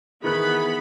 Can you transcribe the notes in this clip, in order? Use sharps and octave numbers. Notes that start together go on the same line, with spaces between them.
D#3 E3 B3 G#4 B5 F#6